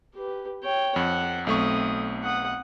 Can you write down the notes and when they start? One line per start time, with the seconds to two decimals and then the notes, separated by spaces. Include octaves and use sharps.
0.15 G4 B4
0.63 C#5 G5
0.96 F2 F#5
1.47 B1 A3 C4 C#6 D#6
2.23 F#5 D#6